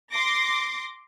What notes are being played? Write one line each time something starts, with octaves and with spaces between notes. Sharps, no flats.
C6 D6 A#6